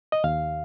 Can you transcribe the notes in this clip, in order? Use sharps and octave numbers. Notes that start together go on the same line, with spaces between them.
D#5
D#2 F5